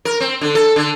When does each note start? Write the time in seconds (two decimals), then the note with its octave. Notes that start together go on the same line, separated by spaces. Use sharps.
0.05 A#4
0.20 C4
0.41 D3
0.55 A4
0.76 D3